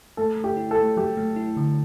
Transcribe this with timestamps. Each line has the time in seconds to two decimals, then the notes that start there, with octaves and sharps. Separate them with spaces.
0.17 A3 A4
0.37 A3
0.44 G4
0.57 E4
0.71 A4
0.77 A3
0.97 F#3 G4
1.17 A3
1.36 E4
1.57 D3